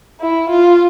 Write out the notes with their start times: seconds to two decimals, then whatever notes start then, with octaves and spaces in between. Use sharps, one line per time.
0.20 E4
0.50 F4